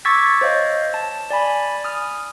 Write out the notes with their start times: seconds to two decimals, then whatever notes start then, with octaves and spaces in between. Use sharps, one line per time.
0.05 C#6 D6 E6 G#6 A6 B6
0.41 C5 C#5 D#5 F5
0.94 A5
1.31 D5 G#5 B5
1.84 D#6 F6